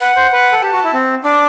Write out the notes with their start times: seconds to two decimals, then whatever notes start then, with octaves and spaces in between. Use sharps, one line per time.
0.01 B4 F#5
0.16 C5
0.32 B4
0.52 A4
0.63 G4 A5
0.73 F#4
0.84 E4
0.93 C4
1.24 D4 D6